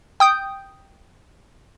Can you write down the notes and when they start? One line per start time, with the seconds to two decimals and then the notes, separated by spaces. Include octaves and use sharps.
0.20 G5 D#6 G6